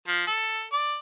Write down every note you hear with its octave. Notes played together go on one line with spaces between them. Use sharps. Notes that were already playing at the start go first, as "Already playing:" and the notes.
F3
A4
D5